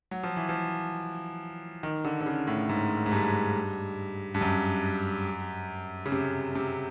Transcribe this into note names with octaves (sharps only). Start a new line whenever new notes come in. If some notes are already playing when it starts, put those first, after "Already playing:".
F#3
F3
E3
F3
D#3
D3
D3
C#3
A2
G#2
G#2
G2
G2
F#2
C#3
C3
C3